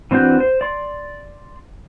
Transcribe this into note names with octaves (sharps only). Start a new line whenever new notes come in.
E3 C4 D4 F#4 G6
C5
D5 C6